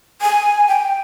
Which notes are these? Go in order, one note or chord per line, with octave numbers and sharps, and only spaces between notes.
G#5
G5